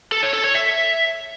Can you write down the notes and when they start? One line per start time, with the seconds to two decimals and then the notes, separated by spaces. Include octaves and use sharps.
0.12 A4
0.23 C#5
0.33 A4
0.44 C#5
0.55 E5